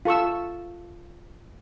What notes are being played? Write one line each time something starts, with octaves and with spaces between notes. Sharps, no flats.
F4 A4 C#6 E6